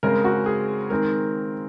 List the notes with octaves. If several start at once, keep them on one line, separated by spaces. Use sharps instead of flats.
C#3 G#3 C4 A#4
F#4
G#4
D#3 G#3 C4 A#4